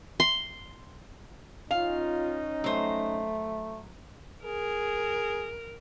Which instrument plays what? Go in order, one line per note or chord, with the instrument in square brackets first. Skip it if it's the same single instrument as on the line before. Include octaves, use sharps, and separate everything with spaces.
[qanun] C6
[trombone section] C#4 D#4 [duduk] F4 [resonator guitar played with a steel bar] F5
[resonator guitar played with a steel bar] F#3 C5 [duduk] A3
[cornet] G#4 [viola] A#4